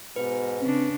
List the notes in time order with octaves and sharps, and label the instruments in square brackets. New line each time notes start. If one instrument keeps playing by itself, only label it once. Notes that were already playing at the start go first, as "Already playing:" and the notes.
[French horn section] G#2 B2 [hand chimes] B4
[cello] C#3 D4 [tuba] C4